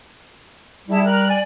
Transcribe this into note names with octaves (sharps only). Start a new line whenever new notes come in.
G3 E4 G#4 A5
A#4 F#6
D5 G#5